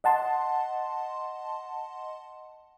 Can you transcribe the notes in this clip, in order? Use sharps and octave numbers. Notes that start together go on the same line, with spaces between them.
D#5 F#5 A5 C6